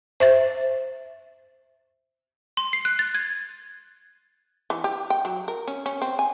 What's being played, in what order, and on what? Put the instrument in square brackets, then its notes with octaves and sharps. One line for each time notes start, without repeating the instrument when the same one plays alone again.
[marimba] C5 E5 A6
[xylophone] C6
C7
F#6
A6
G#6
[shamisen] E3
G4
G5
F#3
A#4
C#4
C#4
C4
G#5